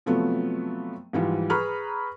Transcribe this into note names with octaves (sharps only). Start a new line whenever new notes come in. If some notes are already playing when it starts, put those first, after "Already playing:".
C3 F3 F#3 A3 B3
G#2 E3 F3 G3
G#4 B4 A#5 B5 C#6 F6